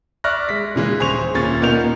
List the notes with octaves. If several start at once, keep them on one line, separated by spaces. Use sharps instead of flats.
D5 E5 C#6 F6 F#6 A#6
G#3 B6
A#2 C#3 E3 G#3
D#1 G#4 C5 C6 C#6 F7
D#1 A#2 C#4 C#6 A6
A#2 B3 D#4 A#4 G6 F7